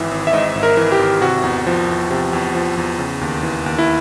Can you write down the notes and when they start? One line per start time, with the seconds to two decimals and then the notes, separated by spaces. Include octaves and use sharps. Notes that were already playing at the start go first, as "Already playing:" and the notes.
Already playing: G#1 G#2 E3 E5
0.11 G#1
0.27 E5
0.33 G#2 D#5
0.55 G#1
0.63 A#4
0.77 E3
0.92 G4
0.99 G#1
1.21 C3 F#4
1.43 E2
1.67 F3
1.89 E2
2.10 C3
2.33 E2
2.55 F3
2.77 E2
2.99 C#3
3.21 D#2
3.43 E3
3.66 D#2
3.78 E4